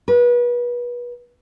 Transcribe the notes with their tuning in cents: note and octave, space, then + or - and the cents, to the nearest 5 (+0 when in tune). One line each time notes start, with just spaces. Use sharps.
B4 -30